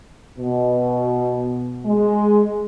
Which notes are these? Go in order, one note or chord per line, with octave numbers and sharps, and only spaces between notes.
B2
G#3